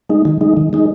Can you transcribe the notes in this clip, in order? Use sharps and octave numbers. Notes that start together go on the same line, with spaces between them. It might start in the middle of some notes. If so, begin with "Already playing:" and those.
G#3 D#4
D#3
G#3 D#4
D#3
G#3 D#4